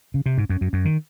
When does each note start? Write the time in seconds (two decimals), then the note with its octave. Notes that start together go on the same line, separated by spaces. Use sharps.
0.14 C#3
0.26 C3
0.38 G#2
0.49 F#2
0.61 F#2
0.73 F#2
0.85 D#3